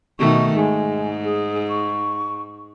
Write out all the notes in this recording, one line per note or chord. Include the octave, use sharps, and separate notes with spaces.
B2 D#3 A3 C#6
G#2 G#3
G#4
C#6